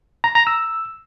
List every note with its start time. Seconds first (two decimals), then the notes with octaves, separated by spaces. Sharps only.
0.24 A#5
0.35 A#5
0.47 E6